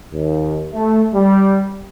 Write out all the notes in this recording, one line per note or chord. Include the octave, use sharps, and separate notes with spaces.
D#2
A3
G3